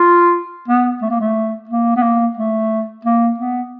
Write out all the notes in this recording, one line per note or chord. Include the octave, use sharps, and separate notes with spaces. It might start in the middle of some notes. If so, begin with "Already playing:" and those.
Already playing: F4
B3
A3
A#3
A3
A#3
B3
A#3
A3
A#3
B3